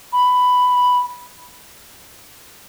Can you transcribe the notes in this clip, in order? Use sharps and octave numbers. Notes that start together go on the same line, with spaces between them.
B5